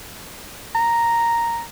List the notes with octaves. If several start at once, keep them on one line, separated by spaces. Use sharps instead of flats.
A#5